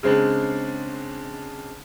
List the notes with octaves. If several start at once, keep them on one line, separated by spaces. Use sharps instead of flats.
C#3 G#3 C4 D4